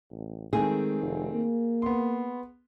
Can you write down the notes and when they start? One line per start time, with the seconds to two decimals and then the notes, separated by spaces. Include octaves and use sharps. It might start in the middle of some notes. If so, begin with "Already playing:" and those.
0.11 A1
0.53 D#3 G#3 A3 C4 G#4
1.02 F1
1.34 A#3
1.82 B3 C6